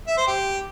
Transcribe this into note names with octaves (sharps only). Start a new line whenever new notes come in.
E5
C5
G4